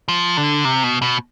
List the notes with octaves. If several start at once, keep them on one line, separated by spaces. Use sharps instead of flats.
F3
D3
C3
B2
B2